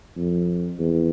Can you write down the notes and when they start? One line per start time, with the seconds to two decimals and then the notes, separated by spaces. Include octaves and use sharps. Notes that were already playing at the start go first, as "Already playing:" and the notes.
0.17 F2
0.79 E2